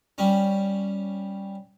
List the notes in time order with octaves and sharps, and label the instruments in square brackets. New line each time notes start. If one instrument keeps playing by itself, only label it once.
[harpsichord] G3 C#4